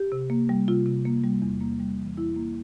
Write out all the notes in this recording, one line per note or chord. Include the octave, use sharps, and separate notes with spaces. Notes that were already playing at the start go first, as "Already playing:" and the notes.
Already playing: G4
C3
A#3
G3
C3 F4
C3
A#3
G3
E2
A#3
G3
E3
E2 E4
A#3